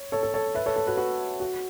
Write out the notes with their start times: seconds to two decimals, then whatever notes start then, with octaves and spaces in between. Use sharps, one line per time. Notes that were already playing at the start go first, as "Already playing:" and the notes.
Already playing: C#5
0.12 A4 C#5
0.23 A4
0.34 A4 C#5
0.55 B4 E5
0.66 A4 C#5
0.76 A4
0.87 F#4 B4
0.97 F#4 B4
1.40 F#4